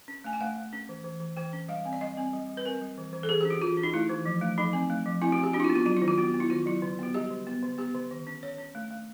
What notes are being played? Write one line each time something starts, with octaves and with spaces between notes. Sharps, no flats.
C#4
A3 G#5
G5
A3 F#5
A3
C#4
E3
E3
E3
E3 G5
C#4
G3 F5
C4
D5
G3 D#5
C4
G3
G3
B4
C4 A#4
G3
E3
E3
A4
E3 G#4
C#4 G4
F#4
E3 F4
C#4
D#4
A3 E4
E3
F3
A3
F3 D#4
C4
A3
F3
C4 E4
F#4
C4
G4
D4 F#4
E4
F4
B3
F4
F#3 F4
E4
D#3
F4
B3 F#4
B3
E4
D#3 F4
F#3 E4
D3
B3 F#4
G3 G4
D3
B3
D3
B3 G4
D3
D#3
C#4
C#4 C#5
C#4
A3
A3